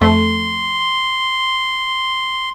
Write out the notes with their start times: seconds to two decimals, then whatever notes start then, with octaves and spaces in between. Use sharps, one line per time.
0.01 F2 A3 C6